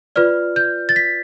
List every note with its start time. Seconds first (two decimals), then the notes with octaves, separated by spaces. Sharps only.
0.16 F4 B4 D5 F6
0.56 G6
0.89 A6
0.96 B6